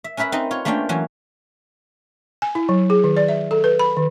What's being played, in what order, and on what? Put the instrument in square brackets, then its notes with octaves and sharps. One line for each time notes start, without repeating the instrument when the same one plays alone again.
[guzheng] E5
C#4 A#4 B4 E5 B5
C4 D#4 B4 D#5
F4 C#5
A3 A#3 C#4 D4 F4 G5
E3 F#3 C#4
[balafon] G#5
E4
F#3
G#4
D#3
D5
E5
A4
B4
B5
D#3